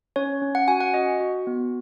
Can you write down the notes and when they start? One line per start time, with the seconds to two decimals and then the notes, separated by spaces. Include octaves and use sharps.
0.16 C#4 C#5
0.42 C#4
0.55 F#5
0.68 F#4 G#5
0.80 F#5
0.94 F#4 D#5
1.20 F#4
1.47 B3